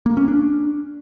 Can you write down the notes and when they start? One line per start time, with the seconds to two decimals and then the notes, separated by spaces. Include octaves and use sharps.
0.06 A#3
0.17 C#4
0.28 D4